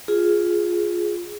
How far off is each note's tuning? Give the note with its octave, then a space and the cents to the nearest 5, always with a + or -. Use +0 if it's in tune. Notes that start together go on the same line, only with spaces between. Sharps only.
F4 +5 G#4 +0